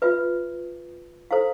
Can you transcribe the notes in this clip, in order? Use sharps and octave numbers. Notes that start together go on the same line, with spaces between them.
F4 B4 E5
E4 A4 C5 F5